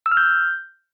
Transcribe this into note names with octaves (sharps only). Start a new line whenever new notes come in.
E6
F6
G6